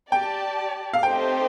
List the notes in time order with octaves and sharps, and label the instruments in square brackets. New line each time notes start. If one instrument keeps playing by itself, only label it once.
[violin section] G4 D5 A5 [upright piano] G5
[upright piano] F5
[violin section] A3 C4 D#4 G4 C5 [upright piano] G5